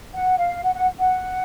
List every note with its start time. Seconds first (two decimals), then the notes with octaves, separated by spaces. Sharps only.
0.14 F#5
0.39 F5
0.63 F#5
0.75 F#5
1.00 F#5